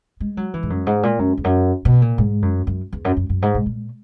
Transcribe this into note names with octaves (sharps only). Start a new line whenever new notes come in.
G#3
F#3
E3
G#2
F#2
G#2
A#2
F#2
E2
F#2
B2
A#2
G#2
F#2
F#2
E2
F#2
F#2
F#2
G#2
A#2
A#2